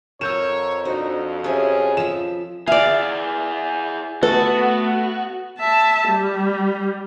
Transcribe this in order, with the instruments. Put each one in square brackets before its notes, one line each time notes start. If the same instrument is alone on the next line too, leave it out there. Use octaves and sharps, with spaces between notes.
[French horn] F2 [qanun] A#4 F#5 [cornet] C#5 [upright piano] E6 G6 E7
[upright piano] D4 C5 [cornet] D#4 [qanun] F#4
[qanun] C#4 C#5 [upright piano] G4 C5 E5 [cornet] G#4
[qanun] F3 E5 [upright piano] E7
[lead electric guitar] E4 G#4 [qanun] D5 F5 [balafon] E5
[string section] A3 B3 [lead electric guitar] F#4 [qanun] A4 [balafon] B4
[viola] E5 A5
G3